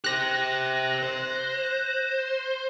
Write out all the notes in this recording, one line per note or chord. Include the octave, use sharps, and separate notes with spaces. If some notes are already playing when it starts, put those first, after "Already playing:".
G4 C5 F#6 A#6
C5